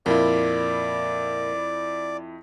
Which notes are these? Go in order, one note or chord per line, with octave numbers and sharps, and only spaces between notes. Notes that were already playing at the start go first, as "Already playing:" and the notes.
F2 A#2 E4 D5